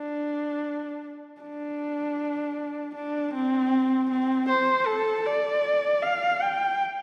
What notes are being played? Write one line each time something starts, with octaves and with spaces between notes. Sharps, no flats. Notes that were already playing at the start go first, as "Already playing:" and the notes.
Already playing: D4
D4
D4
C4
C4
C5
A4
D5
F5
G5